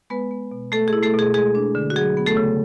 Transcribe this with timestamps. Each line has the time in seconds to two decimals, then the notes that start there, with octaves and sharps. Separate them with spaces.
0.10 G#3 B3 B4
0.31 B3
0.51 B2
0.72 A3 A4
0.88 G#4
0.93 E4
1.03 A3 A4
1.14 B2 G#4
1.34 G#3 G#4
1.55 D4
1.75 D3
1.90 F#4
1.96 F#3 G#4
2.17 B3
2.26 A3 A4
2.37 C#3